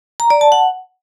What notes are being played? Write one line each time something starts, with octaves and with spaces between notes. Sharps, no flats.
A#5
D5
A5
F#5